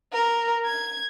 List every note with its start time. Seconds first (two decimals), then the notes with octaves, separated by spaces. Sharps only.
0.13 A#4
0.66 G#6